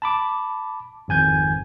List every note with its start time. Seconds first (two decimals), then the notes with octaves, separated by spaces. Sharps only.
0.02 A5 B5 D6
1.08 G#1 F2 G#5 G6 G#6